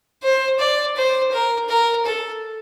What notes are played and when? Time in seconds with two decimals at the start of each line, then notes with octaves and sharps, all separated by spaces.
0.23 C5
0.59 D5
0.96 C5
1.32 A#4
1.69 A#4
2.05 A4